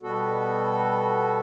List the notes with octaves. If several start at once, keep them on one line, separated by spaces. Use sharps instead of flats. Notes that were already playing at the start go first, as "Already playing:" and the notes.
B2 G3 B3 F#4 A4